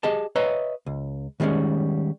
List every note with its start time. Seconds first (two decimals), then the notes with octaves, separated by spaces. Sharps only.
0.03 G4 G#4 D#5 A5
0.36 B4 C#5 D#5 E5 A#5
0.86 C#2
1.40 D#3 G3 G#3 C4 C#4